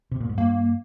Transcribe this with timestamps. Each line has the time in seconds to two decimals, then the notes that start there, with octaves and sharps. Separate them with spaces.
0.11 C3
0.20 A#2
0.29 G#2
0.38 G2 A#3